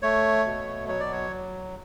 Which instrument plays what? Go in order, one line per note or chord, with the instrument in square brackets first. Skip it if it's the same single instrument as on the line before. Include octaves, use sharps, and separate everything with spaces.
[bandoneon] A3 C#5
B2
F#3 C#5
D5
C#5